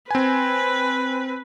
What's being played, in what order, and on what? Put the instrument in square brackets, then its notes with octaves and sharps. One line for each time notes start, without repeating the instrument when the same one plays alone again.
[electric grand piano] C4 G#5 [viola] B4